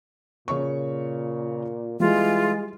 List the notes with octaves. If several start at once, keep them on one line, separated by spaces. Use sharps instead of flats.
A#2 C#3 C#5 C#6
E3 G3 G#3 F4